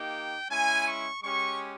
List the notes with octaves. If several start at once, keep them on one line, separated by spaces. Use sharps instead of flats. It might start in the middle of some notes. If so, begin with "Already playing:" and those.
Already playing: A#3 D#4 G4 G5
G#3 C#4 E4 G#5
C#6
G#3 C#4 G4 C#6